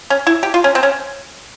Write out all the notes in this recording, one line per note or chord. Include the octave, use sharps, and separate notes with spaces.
C#4
E4
G4
F4
C#4
C4
C#4